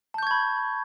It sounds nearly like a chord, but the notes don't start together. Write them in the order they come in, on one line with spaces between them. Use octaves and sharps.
A5 G6 C#6 G#6 B5